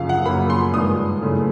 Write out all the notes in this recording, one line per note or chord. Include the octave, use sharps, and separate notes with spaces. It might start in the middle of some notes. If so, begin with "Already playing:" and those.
Already playing: F#2 C#3 F3 F5
F#5
F#2 C#3 F3 A#3 B5
C6
G2 D#3 G#3 D#6
F#2 C#3 E3 A3